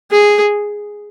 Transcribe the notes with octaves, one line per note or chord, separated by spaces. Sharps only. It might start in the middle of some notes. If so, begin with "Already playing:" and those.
G#4